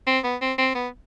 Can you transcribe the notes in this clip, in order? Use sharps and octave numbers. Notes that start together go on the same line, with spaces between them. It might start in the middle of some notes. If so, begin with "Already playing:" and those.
C4
B3
C4
C4
B3